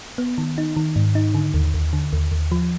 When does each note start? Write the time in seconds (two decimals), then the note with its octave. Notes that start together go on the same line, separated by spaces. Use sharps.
0.18 B3
0.38 D#3
0.58 D#4
0.77 D#3
0.96 G#2
1.15 D#4
1.35 D3
1.54 D#2
1.74 D#2
1.93 D3
2.13 D#2
2.32 D#2
2.52 F3